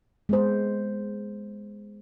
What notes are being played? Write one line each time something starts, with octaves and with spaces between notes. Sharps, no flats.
G#3 B3 C5